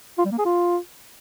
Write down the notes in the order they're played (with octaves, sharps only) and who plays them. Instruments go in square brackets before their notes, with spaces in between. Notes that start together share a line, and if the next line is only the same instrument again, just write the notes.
[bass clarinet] F4
G3
A#3
G#4
F4